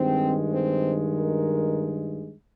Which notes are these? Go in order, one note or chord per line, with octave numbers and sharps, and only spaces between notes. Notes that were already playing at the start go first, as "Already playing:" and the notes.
Already playing: G2 D#3 G#3 C4
C4
A#4